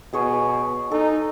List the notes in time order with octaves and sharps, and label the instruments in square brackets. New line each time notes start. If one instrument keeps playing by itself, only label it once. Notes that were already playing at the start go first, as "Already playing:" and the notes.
[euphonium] B2 [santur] G#4 C#5
[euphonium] D#4 [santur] A4